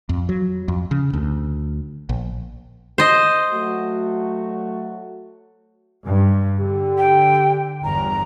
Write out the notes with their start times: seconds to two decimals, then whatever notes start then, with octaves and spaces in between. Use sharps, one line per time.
0.09 F2
0.29 F#3
0.68 F2
0.91 C#3
1.13 D2
2.09 A#1
2.98 C5 D#5
3.53 F#3 A3 F#4
6.05 G2
6.59 D3 G4
6.98 G5
7.84 G1 E2 A#5